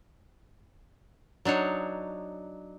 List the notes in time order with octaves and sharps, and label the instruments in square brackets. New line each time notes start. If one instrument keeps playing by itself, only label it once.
[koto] F#3 D4 D#4 C#5